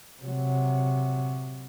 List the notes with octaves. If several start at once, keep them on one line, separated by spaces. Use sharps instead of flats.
C3 F#3